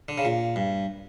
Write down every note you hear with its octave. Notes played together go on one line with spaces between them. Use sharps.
D3
C#3
A#2
G2